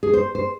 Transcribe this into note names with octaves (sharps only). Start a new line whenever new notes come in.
G#4
C5
C5